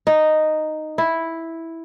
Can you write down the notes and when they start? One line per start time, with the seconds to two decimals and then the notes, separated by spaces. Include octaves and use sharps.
0.07 D#4
0.98 E4